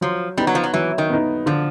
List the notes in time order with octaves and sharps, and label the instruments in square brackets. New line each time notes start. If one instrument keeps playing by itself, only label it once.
[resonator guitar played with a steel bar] F3 [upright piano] F#3
[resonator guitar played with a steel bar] G3 [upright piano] B3 D#4
[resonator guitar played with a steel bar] F#3
F3
F#3
[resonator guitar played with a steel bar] E3 [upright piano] F#3
[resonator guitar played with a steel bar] D#3
[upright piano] B3 D#4
[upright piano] D3 [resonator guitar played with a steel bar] F3